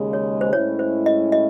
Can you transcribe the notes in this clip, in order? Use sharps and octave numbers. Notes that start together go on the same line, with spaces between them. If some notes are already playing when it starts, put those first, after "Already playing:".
Already playing: D#2 C#3 G#3
C#5
C5
A2 G#3 C#4 E4 C#5
C5
D#5
D#5